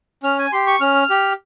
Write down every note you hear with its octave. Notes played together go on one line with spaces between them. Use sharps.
C#4 F6
G#5
G4 C6
C#6
C#4 F6
G4